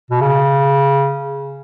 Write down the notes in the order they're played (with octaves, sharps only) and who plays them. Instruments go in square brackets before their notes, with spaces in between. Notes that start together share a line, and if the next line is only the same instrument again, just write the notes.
[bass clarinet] B2
C#3